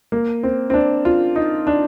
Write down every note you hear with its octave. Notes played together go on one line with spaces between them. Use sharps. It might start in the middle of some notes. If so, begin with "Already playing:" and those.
A#3
C4
C4
D4
F4
D#4
D4